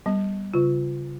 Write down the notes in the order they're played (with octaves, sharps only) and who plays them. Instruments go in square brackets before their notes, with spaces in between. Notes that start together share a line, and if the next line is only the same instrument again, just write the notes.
[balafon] G3 [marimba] B3
[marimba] C#3 F4